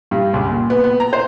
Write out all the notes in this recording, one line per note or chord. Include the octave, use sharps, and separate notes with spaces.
G2
C#2
A#2
B3
B3
A#5
C5